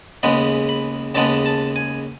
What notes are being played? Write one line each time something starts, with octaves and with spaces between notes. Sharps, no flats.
D#2 C#3 G#3 B3 B5
B5
D#2 C#3 G#3 B3 A5
A5
G#5